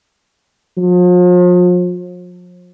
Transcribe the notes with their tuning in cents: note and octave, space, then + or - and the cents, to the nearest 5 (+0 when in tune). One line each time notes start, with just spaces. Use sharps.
F3 +40